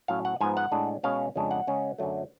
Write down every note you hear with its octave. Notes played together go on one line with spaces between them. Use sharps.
A2 F#3 C#4 F5
F#5
G#2 F3 B3 G#5
F#5
A2 G#3 D4
B2 G#3 C#4 F5
F2 C#3 G#3 D4
F#5
C#3 G#3 C#4
F#2 D3 F#3 A3